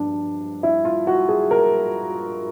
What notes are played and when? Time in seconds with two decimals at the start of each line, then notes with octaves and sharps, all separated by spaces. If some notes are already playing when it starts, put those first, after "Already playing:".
Already playing: G2 F3 D4
0.63 E4
0.85 F4
1.07 F#4
1.29 G#4
1.51 A#4